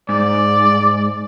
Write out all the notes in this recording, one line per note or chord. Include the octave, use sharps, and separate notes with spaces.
G#2 D5